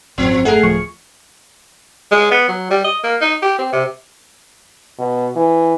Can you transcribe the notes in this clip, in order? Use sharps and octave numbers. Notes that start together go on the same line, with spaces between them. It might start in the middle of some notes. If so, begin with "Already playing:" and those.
G#1 F#2 F3 C4
A3 G#4 A#4 F#5
D1 F3 C#6
G#3
B3
F#3
G3
D#5
A#3
D#4
G4
C4
C3
B2
E3